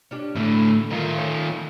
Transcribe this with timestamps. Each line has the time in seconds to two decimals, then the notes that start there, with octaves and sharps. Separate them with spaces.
0.11 C#4 D4 G4
0.36 A2 D3 A3 C#4
0.91 D#3 A3 F4 A#4
1.18 C#5